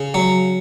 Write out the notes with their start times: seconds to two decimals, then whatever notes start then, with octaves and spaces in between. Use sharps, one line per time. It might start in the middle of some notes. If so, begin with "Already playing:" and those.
Already playing: C#3
0.14 F#3